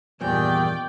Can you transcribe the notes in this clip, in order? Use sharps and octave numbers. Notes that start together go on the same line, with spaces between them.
E2 G2 A#2 D#3 D5 G5